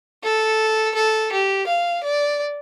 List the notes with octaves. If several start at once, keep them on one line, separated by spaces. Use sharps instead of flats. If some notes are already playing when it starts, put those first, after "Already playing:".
A4
A4
G4
F5
D5